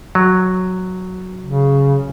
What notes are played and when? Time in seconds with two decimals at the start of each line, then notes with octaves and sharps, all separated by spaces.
0.15 F#3
1.44 C#3